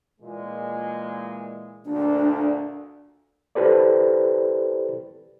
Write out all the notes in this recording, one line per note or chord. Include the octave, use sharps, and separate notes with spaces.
A#2 E3 G#3
D2 A#2 D4
E4 G4 A4 B4 C5 D5